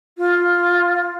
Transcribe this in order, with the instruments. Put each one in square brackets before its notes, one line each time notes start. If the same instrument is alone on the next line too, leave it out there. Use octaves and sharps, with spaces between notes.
[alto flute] F4